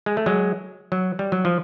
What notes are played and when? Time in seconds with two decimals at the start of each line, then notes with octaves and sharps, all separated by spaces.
0.06 G#3
0.17 A3
0.26 F#3 G#3
0.92 F#3
1.19 G3
1.32 F#3
1.45 F3